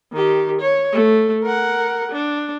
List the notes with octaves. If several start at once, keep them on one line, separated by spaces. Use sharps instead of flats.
D#3 G4
C#5
A3
A#4 F#5
D4